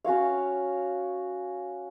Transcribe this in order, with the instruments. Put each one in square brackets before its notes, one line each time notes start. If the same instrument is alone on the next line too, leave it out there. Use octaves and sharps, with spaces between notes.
[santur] C#4 F#4 C#5 F5